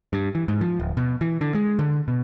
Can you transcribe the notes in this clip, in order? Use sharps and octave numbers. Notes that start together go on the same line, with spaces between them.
G2
E3
G#2
F3
D1
B2
E3
D3
G#3
D3
B2